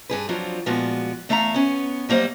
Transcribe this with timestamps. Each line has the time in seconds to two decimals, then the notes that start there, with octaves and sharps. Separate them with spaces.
0.09 G2 G#4 B4
0.29 F3 F#3 C4 D4 F4
0.66 A#2 F3 G#3 B3 F#4 D5
1.29 E2 A3 E5 F5 G#5 A#5
1.54 B3 C#4
2.09 F#3 G3 A#3 C5 D#5